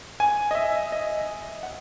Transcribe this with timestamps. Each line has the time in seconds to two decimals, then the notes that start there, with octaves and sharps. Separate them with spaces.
0.20 G#5
0.51 D#5
0.55 E5
0.92 D#5
1.63 F#5